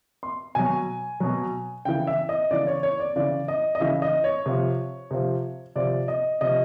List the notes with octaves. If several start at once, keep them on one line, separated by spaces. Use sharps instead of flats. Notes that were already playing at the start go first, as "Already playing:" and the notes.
C6
B2 F#3 G#5
B2 F#3
C#3 E3 G5
E5
D#5
C#3 E3 D5
C#5
C#5
D5
C#3 E3 D5
D#5
D#5
C#3 E3 E5
D#5
C#5
C3 F3
C3 F3
C3 F3 D5
D#5
C3 F3 D#5